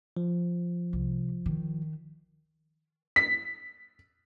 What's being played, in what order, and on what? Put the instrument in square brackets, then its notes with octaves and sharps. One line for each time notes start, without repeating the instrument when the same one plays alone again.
[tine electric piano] F3
[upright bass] C2
D#3
[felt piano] B6